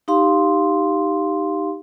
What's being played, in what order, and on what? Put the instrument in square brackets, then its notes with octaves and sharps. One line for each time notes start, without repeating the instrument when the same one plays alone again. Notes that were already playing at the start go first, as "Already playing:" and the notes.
[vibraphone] D#4 G4 F5 C6